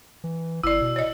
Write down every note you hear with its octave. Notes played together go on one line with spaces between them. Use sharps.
E3
G1 E4 D5 E6
B2
C#5 D#5